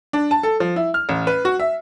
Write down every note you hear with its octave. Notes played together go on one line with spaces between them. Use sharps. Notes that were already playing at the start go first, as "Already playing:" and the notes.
D4
A5
A4
F3
E4
F6
A1
B4
F#4
E5